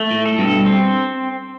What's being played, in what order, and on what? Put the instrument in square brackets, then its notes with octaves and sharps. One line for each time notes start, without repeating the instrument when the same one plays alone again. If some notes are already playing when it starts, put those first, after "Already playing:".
Already playing: [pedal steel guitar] A3
[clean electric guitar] A2
[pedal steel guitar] A4
[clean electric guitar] G2 B2
[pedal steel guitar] C4